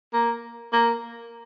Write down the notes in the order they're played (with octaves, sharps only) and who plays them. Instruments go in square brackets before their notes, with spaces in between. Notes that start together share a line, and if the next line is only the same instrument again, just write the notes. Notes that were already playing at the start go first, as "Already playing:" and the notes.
[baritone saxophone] A#3
A#3